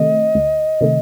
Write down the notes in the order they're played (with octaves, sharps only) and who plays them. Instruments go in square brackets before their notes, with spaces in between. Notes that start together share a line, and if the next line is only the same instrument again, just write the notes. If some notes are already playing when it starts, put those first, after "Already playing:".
Already playing: [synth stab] C3 D#3 A3 [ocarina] D#5
[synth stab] D2
C3 D#3 A3